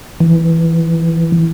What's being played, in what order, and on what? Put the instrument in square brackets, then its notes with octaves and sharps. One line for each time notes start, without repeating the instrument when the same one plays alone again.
[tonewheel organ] E3